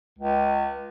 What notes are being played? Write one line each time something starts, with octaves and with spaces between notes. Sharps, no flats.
C#2